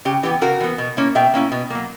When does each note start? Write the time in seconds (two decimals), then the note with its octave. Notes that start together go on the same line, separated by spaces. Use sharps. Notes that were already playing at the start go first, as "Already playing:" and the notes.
0.05 C#3 G4
0.23 E3 B3 G4
0.41 C#3 F#4 A#4
0.60 E3 B3
0.78 B2
0.97 A#3 C#4 E4
1.15 B2 E5 G5
1.34 A#3 C#4 E4
1.52 B2
1.70 F#3 A#3